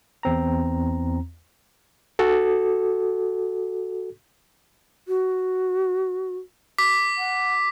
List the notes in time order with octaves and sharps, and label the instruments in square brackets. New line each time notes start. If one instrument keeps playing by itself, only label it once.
[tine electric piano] E2 C4 A#5
[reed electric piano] F#4 A4
[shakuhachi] F#4
[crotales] D6 B6
[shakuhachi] F#5